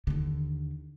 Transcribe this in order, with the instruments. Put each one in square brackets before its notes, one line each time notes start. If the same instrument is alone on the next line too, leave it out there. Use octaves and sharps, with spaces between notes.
[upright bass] D#2 D3